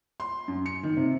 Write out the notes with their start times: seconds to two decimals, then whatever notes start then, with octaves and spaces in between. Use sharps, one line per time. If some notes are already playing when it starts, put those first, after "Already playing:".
0.20 C6
0.48 F#2
0.66 C#7
0.83 D#3
0.97 C3